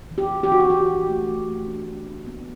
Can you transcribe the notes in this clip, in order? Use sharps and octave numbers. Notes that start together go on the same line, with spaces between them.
E3
G4
E3
G4
D4 F#4
G4
E3 G4
E3
A3
E3
A3
D4
D4
D4
B3